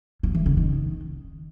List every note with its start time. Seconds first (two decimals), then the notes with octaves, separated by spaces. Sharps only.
0.23 F3
0.35 E3
0.46 C#3
0.57 D#3